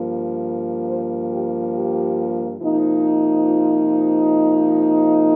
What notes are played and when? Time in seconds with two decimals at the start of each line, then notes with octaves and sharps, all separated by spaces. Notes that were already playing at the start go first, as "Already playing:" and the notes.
Already playing: G2 F3 A#3
0.88 C5
1.30 G4
1.74 G4
2.59 C3 F3 A#3 D#4
3.45 F4